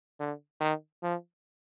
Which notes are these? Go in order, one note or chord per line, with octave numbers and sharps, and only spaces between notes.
D3
D#3
F3